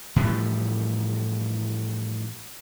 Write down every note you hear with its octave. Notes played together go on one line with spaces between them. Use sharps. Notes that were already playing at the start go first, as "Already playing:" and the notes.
A2 E3 F3 G3